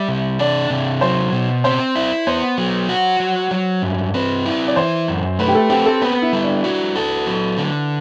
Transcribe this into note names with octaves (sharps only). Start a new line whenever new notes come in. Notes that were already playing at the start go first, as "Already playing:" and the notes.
Already playing: G3 E5
C3
D4 D5
C3
F#3 C5
B2
C4 C5
E4
B3 C5
F#3
F#4
F#3
F#3
G2
C4 B4
E4
D5
E3 C5
F#2
A3 B4
G4
A4
C4 G4
A4
B3 B4
E4
G3
D4
F#4
A4
F#3
D3